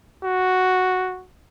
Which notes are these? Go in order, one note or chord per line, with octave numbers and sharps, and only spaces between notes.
F#4